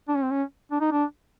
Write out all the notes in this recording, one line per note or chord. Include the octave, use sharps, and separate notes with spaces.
D4
C#4
C4
C#4
D4
D#4
D4